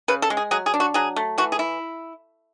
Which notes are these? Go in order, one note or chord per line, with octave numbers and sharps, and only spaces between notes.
C#3 B4
A4
G#3
G#4
F#3 G#4
G#4
D4
F#4
F#3 G#4
A3
E3 F#4
G#4
E4